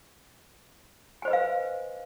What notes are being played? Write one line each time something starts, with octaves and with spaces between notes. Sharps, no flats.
B4 C5 D#5 F5 G#5